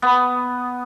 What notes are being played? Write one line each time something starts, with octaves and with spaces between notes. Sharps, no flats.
B3